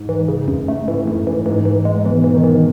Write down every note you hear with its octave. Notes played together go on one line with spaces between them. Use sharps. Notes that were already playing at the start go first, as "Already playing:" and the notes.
Already playing: G#2
E3
C#3
F#2
A3
A2 E3
F#2
E3
G#2 E3
E3
G#3
B2 E3
E3
D#3
E3